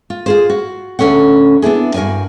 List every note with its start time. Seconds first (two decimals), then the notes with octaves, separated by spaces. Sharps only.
0.10 F4
0.26 F4 G#4 C5
0.50 F#4
0.99 D2 E3 C#4 A4 F#5
1.62 B3 D4 E4 G#4
1.94 G2 F#4 A#4 D5 G#5